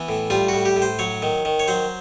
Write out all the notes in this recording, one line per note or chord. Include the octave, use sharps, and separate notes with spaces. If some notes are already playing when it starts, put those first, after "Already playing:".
Already playing: E3 B3
A2
G3 F4
A2 F#4
G4
A2
C5
F#3 C#5
D#3
D#3
C#5
F#3 C5